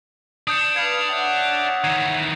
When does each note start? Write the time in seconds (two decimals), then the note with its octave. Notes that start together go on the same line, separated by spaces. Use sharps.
0.47 D4 D#6 G6 C#7
0.76 B4 F5 G#6 C#7 F7
1.10 C#5 E5 F#5
1.84 D#3 E3 G#6 C7